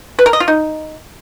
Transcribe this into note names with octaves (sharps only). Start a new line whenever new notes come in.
B4
A#4
D#5
F4
D#4